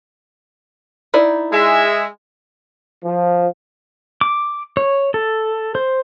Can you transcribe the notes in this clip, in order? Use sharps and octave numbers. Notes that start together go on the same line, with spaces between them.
D#4 E4 D5
G#3 G#4 E5
F3
D6
C#5
A4
C5